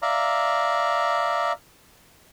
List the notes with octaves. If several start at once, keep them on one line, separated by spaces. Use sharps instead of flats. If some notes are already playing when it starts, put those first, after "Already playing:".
D5 E5 F5 A#5